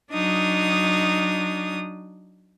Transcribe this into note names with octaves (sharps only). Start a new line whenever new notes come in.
F#3 D4 D#4 D#6